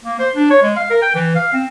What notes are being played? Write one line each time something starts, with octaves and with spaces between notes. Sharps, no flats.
A#3
C5
D4
C#5
G#3
F5
A#4
G5
E3
F5
C4